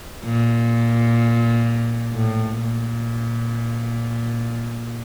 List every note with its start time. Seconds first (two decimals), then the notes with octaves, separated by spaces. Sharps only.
0.25 A#2
2.13 A2
2.61 A#2